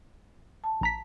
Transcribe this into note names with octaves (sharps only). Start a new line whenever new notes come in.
A5
A#1 A#5 B6